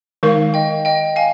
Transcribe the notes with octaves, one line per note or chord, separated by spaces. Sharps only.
D#3 G#3 D#4 A#4 F5
D#5 G5
D#5 G5
F5 G#5